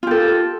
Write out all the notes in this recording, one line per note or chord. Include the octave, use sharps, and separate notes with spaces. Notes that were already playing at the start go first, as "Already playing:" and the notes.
F4 G4 A4